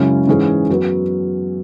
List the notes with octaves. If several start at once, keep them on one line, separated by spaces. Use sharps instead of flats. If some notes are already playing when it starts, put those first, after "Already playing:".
Already playing: F#2 C#3 G#3 C#4 E4
G#2 E3 C#4 G#4
F#2 F#3 B3